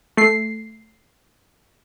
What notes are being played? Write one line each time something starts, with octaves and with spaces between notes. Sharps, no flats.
A3 C7